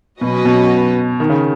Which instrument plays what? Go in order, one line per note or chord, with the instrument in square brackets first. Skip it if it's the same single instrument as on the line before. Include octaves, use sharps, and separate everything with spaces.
[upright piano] B2 [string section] F#3 C#4 F#4 B4 D#5
[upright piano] B2
D#3
C#3